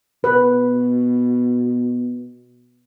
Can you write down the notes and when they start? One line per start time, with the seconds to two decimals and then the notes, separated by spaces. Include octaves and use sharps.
0.24 B2 B4